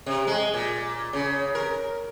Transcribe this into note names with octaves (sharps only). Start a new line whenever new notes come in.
C3
G#3
A#2
C#3
A#4